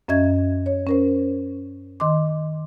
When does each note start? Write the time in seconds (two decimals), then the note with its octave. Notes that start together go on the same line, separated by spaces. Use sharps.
0.08 F#2 C#4 D#5 E5 G#6
0.66 C#5
0.87 C#4 A#4 C5
2.00 D#3 D#5 C6 D6